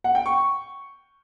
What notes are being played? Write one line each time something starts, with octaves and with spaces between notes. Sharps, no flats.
F#5
G5
C#6